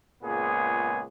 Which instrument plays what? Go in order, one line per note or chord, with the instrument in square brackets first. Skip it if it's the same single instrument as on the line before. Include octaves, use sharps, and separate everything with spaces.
[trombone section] C#2 A#2 B3 G#4